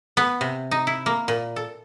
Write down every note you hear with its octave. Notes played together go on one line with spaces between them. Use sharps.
B3
C3
D#4
E4
A#3
A#2
A4